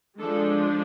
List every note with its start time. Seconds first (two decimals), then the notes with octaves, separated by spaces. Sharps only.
0.19 F3 G#3 D4 A4